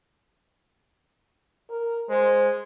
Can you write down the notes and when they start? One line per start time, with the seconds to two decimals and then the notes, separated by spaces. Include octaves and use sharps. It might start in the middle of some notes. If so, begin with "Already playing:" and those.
1.70 A#4
2.09 G#3 C5